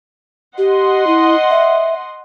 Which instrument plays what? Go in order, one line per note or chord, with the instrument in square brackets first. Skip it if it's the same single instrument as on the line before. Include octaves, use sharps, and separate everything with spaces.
[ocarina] G4 [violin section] D#5 F#5 C6
[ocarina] E4
E5